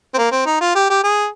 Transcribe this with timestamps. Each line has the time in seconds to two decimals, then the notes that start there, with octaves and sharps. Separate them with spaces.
0.14 C4
0.18 A#3
0.31 C4
0.46 D#4
0.61 F4
0.75 G4
0.90 G4
1.03 G#4